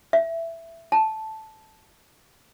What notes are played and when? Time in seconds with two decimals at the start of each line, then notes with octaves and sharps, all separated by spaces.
0.13 E5
0.92 A5